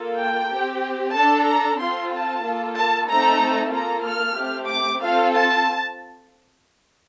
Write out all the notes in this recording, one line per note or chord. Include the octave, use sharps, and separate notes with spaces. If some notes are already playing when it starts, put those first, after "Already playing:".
Already playing: A#3 F4 A4
G5
C4 G4
D4 A4 A5
A#5
C4 F4 A4 C6
A5
A#3 F4 A4
A5
A3 C4 D#4 A4 A#5
A#3 F4 A4 A#5
F6
A3 C4 G4
D6
C4 F4 A4 F5
A5